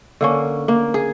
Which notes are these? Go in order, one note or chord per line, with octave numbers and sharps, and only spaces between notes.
D3 A#3 C#4
A#3
G#4